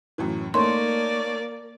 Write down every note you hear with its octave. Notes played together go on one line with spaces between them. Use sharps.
F#2 A2 E3
A3 A#3 D#4 C#5 D5 C6